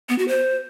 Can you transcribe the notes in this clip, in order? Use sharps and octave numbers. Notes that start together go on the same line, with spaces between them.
B3
F#4
C5